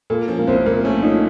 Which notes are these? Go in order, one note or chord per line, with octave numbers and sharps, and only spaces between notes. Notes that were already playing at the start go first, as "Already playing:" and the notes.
A#2 A4
F3 C#4
A#3
C2 C4
A#2 A#3
A3 C#4
F3 D#4